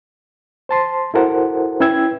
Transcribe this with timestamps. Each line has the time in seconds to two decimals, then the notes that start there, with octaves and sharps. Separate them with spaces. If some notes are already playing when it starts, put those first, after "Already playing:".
0.69 C5 A5 C6
1.14 E4 F#4 A4 A#4 C5 F#5
1.80 C#4 E4 B4 G5 E6 G#6